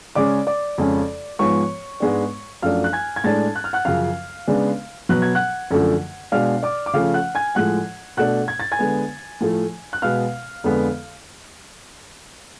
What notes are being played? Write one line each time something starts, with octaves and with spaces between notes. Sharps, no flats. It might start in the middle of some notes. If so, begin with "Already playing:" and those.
C#3 G#3 C#4 D5 D6
D5 D6
F2 C#3 G#3 C#4
G#2 F3 G#3 B3 C#5 C#6
G#2 G#3 B3 D4
F#2 F3 A3 D4 F5 F6
F#6
G#5 G#6
G#6
A2 G#3 D4 A5 A6
F#6
F6
F#5 F#6
F#2 C#3 F3 F5 F6
C#3 G#3 B3 D4
B2 F#3 B3 F#6
G#6
F#5 F#6
F#2 D3 F3 A3
B2 G#3 D4 F5 F6
D5 D6
D6
C#3 F3 A3 C#4 F5 F6
F#5 F#6
G#5 G#6
A2 F3 G#3 F#5 F#6
B2 A3 D4 F#5 F#6
G#6
A6
G#5 G#6
D3 G#3 B3
A2 F3 A3
F#6
B2 G#3 B3 F5 F6
F2 D3 G#3 B3